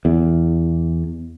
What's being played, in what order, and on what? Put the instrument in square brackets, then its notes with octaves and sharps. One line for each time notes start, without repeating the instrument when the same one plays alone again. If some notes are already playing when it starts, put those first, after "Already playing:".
[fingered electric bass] E2